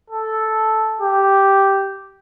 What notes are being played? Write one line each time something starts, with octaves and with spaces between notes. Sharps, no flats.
A4
G4